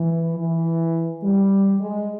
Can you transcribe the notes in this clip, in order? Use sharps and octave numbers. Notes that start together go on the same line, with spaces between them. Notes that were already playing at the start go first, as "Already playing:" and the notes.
Already playing: E3
E3
G3
G#3